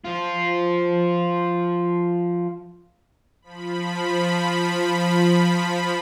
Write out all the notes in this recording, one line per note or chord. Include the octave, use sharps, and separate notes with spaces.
F3 F4
F3 B5